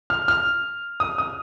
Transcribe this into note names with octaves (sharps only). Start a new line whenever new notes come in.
F6
F6
D#6
D#6